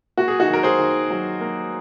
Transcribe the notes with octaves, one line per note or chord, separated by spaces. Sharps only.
A#3 F#4
G#4
D#4 F#4
D#3
A#4
G#4 C5
D#3
F#3
A#3